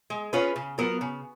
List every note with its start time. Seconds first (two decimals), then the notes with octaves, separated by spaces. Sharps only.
0.10 G#3
0.33 C#4 F4 G#4 B4
0.56 C#3
0.78 F#3 B3 F4 A#4
1.01 C#3